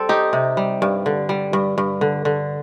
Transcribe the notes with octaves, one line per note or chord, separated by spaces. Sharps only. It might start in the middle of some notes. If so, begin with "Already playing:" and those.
Already playing: G3 C4 A4
D#4 G4
C3
G3
G2
D3
G3
G2
G2
D3
D3